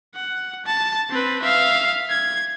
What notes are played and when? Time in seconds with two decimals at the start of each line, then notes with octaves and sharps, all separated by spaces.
0.15 F#5
0.66 A5
1.10 C4 B4
1.42 E5 F5
2.10 G#6